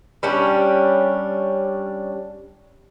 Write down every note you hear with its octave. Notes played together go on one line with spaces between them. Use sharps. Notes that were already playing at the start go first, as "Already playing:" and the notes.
G3 C#4 D4